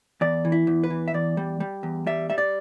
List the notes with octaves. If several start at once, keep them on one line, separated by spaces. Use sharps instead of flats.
E2 D5
E3
E4
E2
B4
E3
E5
E2 D5
G3
G3
E2
G3 E5
G3 E5
D5